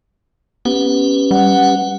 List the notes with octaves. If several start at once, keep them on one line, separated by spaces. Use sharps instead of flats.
B3 C#4 G4 B4
G3 F#5